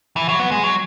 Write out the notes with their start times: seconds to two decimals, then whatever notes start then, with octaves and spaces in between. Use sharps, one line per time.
0.16 E3
0.28 F#3
0.39 B3
0.51 G#3
0.63 F#3